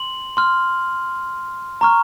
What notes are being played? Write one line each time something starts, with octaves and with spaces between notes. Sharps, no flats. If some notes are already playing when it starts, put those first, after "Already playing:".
Already playing: C6 F#7
C6 F6
A#5 C#6 F6